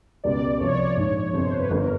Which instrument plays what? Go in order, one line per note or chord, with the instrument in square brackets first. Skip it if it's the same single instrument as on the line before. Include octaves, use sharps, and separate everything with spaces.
[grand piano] C#2 B2 G3 [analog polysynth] D5
[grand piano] C2 C3 F3 [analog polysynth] C#5
[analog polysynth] D5
C#5
[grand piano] A#1 G#2 F3
[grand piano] G1 F2 C3 [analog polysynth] C5
[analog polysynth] B4
[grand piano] G1 G2 D3 [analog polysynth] A#4